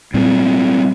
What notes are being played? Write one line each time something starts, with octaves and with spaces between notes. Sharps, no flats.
A#2 G3 C4